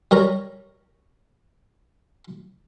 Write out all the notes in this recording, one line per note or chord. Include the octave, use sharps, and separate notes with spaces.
G3 A#4 C#5 A#5